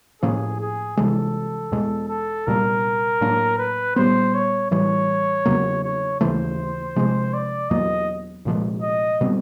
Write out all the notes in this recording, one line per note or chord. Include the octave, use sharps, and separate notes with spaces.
A2 F3 A#3 C#4 G#4
G#4
C2 C3 E3 G#3 A4
E2 B2 G#3
A4
C2 A#2 G3 A#3 A#4
A2 F#3 A#3 D4
B4
A#2 G3 B3 C5
C#5
A2 E3 G3 C#5
E2 C#3 F#3 A#3
C#5
D#2 C#3 E3 A3 C5
C3 F3 G#3
D5
E2 B2 F#3 A#3 D#5
C2 A#2 F3 G#3
D#5
B2 G3 C4